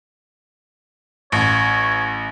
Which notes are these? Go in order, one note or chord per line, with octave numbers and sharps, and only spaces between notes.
A1 C#5